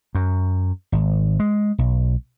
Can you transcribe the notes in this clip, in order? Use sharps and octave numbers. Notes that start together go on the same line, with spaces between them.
F#2
G#1
G#3
B1